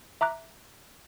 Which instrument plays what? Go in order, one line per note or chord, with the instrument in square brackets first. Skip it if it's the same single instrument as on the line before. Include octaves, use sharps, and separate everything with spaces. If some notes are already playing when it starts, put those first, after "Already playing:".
[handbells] E5 A#5 D6 F#6